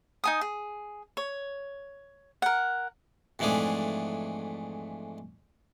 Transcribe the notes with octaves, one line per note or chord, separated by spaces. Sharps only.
D#4 G#5 D#6
G#4
C#5
A#4 F#5
F2 G#2 E3 A3 D4 G#4